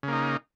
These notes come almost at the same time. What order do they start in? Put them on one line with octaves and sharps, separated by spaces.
C#3 A#3 D#4